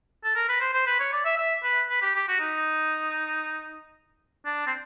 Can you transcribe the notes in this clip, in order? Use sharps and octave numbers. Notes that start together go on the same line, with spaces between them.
A4
A#4
B4
C5
C5
B4
C#5
D5
E5
E5
B4
B4
G4
G4
F#4
D#4
D4
C4